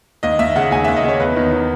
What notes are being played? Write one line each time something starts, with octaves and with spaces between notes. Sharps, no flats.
D#2 D#5
D#2 E5
C#3 F#5
D#2 G#5
D#2 E5
D#5
C#3 C#5
E2 B4
D#3
D#3